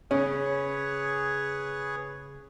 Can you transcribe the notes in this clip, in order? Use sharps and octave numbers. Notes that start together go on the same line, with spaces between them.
C#3 C#4 G#4 B4 C#5